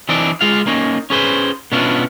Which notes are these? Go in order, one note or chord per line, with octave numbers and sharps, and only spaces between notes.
E3 C4 D4 D#4 D5
G#3 F4 F5
A#3 C#4 D#4
C#4 G#4 B4 C5
B2 B3 C#4 D4 E4 F4